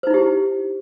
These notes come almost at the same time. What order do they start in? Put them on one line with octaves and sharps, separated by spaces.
C5 D#4 E4 G4